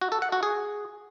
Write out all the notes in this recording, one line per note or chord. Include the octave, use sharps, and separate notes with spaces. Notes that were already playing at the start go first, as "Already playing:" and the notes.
F#4
A4
F#5
F#4
G#4